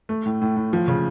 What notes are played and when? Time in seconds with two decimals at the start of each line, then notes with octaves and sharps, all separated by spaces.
0.09 A3
0.26 A2
0.42 A2
0.57 A2
0.73 F3
0.88 C#3